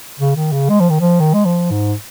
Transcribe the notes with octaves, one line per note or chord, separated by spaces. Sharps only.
C#3
D#3
C#3
G#3
F3
D#3
F3
D#3
G#3
F3
G#2